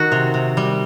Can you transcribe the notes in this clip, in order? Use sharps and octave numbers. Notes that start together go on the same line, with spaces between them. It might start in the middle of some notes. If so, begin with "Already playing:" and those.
Already playing: D#3 F#4
C3
C3
G3